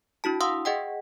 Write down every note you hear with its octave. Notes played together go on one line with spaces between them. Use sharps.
D4 E4 F#4 A5
F5 F#5 C6 D#6 E6
G#4 D#5 F#5 G5